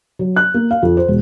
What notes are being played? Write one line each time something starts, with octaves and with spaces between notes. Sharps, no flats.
F#3
F#6
A#3
F5
F2
C5
E1